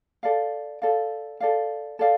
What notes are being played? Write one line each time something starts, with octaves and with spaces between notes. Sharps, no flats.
A4 D5 F5
A4 D5 F5
A4 D5 F5
A4 D5 F5